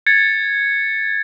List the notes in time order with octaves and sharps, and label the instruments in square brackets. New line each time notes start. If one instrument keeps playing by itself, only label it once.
[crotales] G#6 A6 C#7